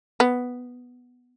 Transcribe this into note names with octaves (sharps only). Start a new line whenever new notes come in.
B3